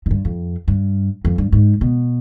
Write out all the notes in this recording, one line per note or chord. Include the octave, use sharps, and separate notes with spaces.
G#2
G2
F2
G2
F2
G2
G#2
B2